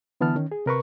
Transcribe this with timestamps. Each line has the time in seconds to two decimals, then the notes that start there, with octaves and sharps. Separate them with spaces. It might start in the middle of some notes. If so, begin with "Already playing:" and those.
0.21 D3 E3 B3 A5 F6
0.36 D#3 C#4
0.52 G#4
0.66 C3 A#4 B4 C#6